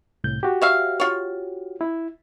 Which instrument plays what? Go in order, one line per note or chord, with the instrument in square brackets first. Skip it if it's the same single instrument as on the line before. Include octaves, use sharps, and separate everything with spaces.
[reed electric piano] C2 A2 G6
F#4 G4
[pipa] C#5 E5 F5
F4 C#5
[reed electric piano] E4